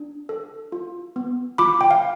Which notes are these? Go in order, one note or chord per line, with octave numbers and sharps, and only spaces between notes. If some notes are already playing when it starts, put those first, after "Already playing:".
Already playing: D4
A4
F4
B3
F4 B5 D6
G5
F5